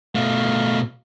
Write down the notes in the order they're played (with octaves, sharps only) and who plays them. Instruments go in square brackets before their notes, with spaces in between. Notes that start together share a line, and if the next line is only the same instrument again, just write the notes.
[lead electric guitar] B2 A3 [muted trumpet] F5